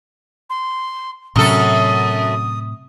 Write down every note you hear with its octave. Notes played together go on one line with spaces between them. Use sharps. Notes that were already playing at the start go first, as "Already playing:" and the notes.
C6
F#2 A2 C3 F#3 A4 D#6